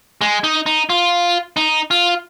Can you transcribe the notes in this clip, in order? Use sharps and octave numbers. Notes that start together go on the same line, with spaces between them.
G#3
D#4
D#4
F4
D#4
F4